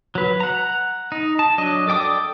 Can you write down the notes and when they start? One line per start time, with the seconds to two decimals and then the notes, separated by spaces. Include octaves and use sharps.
0.15 F#3 B4
0.40 F#5 A#5
1.12 D#4
1.39 A5
1.58 F#3 D4 D#5
1.87 A4 D5 G5 D6 D#6